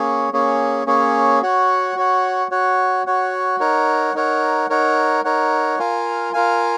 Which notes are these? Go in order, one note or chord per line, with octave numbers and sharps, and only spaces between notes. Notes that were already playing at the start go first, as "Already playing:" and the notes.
Already playing: A#3 C#4 G#4 C#5
A#3 C#4 G#4 C#5
A#3 C#4 G#4 C#5
F#4 C#5 F#5
F#4 C#5 F#5
F#4 C#5 F#5
F#4 C#5 F#5
D#4 A#4 C#5 F#5
D#4 A#4 C#5 F#5
D#4 A#4 C#5 F#5
D#4 A#4 C#5 F#5
F4 A#4 F5 G#5
F4 A#4 F5 G#5